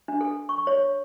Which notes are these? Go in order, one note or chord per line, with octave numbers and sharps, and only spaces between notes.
D4
A4
C#6
C#5